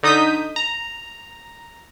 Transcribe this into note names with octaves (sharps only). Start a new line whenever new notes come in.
D3 D#4 D#6 G6 B6
A#5